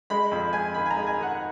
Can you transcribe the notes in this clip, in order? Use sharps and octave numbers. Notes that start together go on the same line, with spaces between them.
G#3 B5
F2
G#3 G#5
D#3 B5
G#5
A#5
G#3
G#5
D#3
F#5